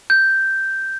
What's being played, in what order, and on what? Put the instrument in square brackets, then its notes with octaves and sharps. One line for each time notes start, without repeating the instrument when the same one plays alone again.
[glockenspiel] G6